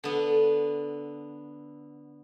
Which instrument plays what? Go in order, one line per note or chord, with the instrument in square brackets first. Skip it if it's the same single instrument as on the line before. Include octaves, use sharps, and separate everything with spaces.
[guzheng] D3 B3